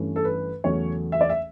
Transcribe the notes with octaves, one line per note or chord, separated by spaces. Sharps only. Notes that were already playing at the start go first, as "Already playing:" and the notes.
Already playing: G2 E3 A3 C#4
A4
B4
E2 C#3 F#3 A3 C#4 C#5
E5
D5
E5